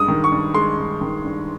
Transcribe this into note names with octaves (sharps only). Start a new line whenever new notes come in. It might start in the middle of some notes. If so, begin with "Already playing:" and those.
Already playing: G2 G#3 D#6
D#3
C#6
G2
G#3 C6
G2
D#3
G2